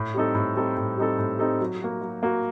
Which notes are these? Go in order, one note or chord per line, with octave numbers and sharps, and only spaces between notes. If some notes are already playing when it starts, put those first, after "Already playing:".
Already playing: A2
G3 C4 D#4 A4
A2
G3 C4 D#4 A4
A2
G3 C4 D#4 A4
A2
G3 C4 D#4 A4
F#3
A#3 F#4
F#3
A#3 F#4